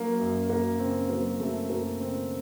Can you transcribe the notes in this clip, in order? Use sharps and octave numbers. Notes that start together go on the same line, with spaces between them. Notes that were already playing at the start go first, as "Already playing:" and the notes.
Already playing: F#3 A#3
F#2
F#2 A#3
C#3 C4
F#3 A#3
F#2 A3
F#2 A#3
C#3 C4